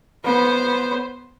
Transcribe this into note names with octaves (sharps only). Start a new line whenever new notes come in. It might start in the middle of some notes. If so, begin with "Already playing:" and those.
B3 C5